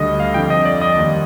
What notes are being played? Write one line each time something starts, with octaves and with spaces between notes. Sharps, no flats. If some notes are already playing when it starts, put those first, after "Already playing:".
Already playing: D2 D3 G3 D#5
F5
F2 D3 F3 G5
D#5
D5
D#5
D#2 D#3 G3